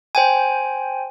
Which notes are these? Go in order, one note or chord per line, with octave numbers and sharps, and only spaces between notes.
C5 G5 G#5